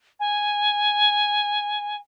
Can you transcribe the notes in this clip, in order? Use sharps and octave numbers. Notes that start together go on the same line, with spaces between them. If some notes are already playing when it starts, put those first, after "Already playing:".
G#5